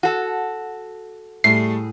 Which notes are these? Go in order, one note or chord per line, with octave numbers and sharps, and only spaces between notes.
F#4 A4
A2 G3 A3 G#4 C7